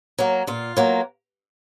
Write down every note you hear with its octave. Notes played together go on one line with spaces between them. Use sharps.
F#3 A#3
A#2 F4
F#3 A#3